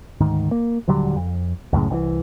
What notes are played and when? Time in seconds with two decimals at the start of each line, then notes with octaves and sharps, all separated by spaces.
0.20 D2 G#2 D#3
0.51 A#3
0.88 D#1 D3 F#3 G3
1.16 F2
1.73 C#2 F#2 A2 C#3
1.90 C2 D3 E3